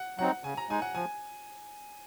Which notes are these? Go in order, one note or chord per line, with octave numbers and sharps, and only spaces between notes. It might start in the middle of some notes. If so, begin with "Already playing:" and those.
Already playing: F#5
F#3 C4 D#4 F#5
C#3 G#5
A#5
G#3 D#4 G#5
F#5
F3 G#5